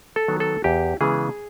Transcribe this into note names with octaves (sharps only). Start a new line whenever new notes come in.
A4
D#3 F#3 B3
A4
E2 G4
C#3 E3 G#3 B3 G#4